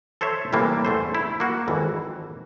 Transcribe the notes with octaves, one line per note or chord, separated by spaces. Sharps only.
A4 C5 C#5 E5
A2 C3 E3 G3 A#3
E2 A3 C5
E4
A#3 F#4
G#1 F2 E3